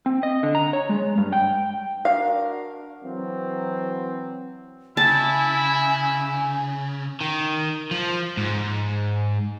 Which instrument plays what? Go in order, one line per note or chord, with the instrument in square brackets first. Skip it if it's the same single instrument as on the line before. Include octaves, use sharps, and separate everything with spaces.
[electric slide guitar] C4
D#5
D3
A#5
C#5
G#3
G2
G5
[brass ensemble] D4 F#4 A#4 [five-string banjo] F5
[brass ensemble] E3 F#3 C4
[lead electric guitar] C#3 [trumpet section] E4 [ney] G#5 [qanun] A5
[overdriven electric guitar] D#3
F3
G#2